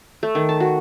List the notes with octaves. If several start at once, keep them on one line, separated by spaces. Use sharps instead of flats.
A3
D#3
A5
F#4